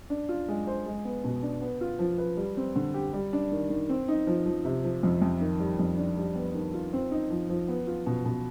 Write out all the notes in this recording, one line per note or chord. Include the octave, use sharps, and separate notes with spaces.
D4
F4
G#3
C5
G#3
B3
B2
D4
B3
F4
F3
B4
G3
C4
D3
G4
G3
D4
D#3
D#3
C4
D#4
F3
F3
C3
F3
F2
F2
D#3
G3
F2
D4
G3
B3
D#3
F4
C4
D#4
F3
F3
B3
F4
B2
B2